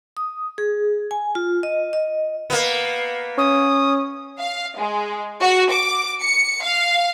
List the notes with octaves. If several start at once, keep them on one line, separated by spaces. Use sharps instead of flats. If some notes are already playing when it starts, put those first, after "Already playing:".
D#6
G#4
G#5
F4
D#5
D#5
A#3 B3
C#4 D#6
F5
G#3
F#4
D6
C#7
F5